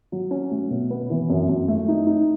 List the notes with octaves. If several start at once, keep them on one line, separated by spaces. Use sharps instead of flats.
F#3
C#4
A3
B2
B3
E3
F#2
F#2
A3
D#4
D#4